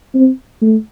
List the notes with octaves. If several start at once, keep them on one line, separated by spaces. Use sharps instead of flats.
C4
A3